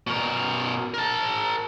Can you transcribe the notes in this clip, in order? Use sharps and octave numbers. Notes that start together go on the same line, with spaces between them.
B2 A#4
A#4 A5